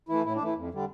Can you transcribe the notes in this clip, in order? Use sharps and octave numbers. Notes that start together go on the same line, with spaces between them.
E3 A3 E4
A2 E4
D4
E3 A3
E4
F2
D3 G3